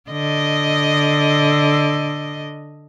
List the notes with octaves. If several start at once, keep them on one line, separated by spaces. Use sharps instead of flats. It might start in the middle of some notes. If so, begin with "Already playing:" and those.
D3 D#5